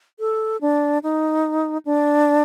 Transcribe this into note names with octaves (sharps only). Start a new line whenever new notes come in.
A4
D4
D#4
D4